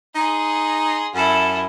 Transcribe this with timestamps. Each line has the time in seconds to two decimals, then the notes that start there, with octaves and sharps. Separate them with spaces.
0.15 D#4 G#4 C6
1.14 F#2 E4 A4